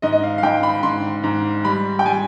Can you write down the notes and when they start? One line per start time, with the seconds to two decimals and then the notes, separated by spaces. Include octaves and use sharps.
0.02 G#2 D#5
0.13 D#5
0.23 F5
0.38 F5
0.43 G#2 G5
0.63 B5
0.83 G#2 C6
1.24 G#2
1.65 G3 B5
1.99 G5
2.05 G3 G#5